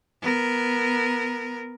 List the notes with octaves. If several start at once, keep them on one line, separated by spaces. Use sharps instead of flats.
B3 A#4